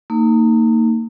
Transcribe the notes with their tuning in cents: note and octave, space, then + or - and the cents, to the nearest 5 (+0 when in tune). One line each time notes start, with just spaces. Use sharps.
A#3 -35 D#4 +0